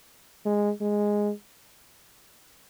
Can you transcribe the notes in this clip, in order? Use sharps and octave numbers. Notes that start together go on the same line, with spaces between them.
G#3
G#3